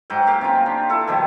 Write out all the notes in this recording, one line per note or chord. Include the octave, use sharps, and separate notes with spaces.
G#2 F#3 F#5 G5
A#3 G4 F5
C3 C#4 F4
D4
E4 F4 A4
B2 D#3 F3 G3